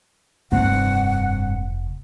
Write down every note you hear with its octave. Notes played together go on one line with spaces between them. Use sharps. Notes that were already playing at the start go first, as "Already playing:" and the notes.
F1 G2 C4 F#5